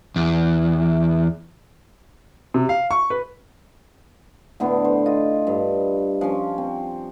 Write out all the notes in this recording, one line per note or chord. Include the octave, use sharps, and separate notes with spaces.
E2
C3
F5
C#6
B4
A2 D3 B3
C5
F4 D#5
G2
F3 C#4
C4